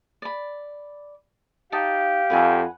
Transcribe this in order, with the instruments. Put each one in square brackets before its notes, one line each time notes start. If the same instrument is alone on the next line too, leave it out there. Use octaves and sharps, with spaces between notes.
[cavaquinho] D5 B5
[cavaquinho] D#4 A5 [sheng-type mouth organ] G4 [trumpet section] F5
[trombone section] F2 [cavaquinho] B4 F#5 G#5